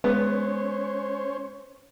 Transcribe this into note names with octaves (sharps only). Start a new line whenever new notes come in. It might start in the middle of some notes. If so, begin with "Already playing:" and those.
G#3 B3 C#4 C5 C#5